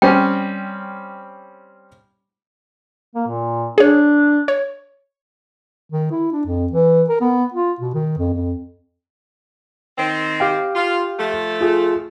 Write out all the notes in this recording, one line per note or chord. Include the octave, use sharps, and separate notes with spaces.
G3 C4 C#4 G5
A#3
A#2
D4 G#4 C#5
C#5
D#3
E4
D4
F2
E3
A#4
B3
F4
B2
D#3
F2
F2
D#3 C4
G4 F5 G5
F4
F3 A3
F4 G#4